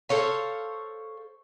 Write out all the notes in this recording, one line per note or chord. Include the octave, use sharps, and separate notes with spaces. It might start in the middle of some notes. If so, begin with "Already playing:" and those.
A4 C5 C#5 F5